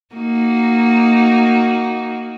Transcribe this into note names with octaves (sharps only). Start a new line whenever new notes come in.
A#3 D#4 F#4